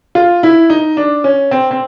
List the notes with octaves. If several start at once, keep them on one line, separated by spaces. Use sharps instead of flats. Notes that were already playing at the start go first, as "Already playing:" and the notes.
F4
E4
D#4
D4
C#4
C4
C4